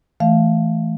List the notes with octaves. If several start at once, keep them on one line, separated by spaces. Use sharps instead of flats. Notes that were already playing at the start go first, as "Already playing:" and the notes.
E3 A3 F5